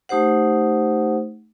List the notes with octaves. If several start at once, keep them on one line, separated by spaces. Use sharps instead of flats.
A3 D#4 G4 C5 F#5